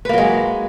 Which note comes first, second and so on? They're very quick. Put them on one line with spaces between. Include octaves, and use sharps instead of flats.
B4 A#3 F#3 G#3